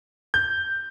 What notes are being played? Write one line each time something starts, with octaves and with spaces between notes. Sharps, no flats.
G6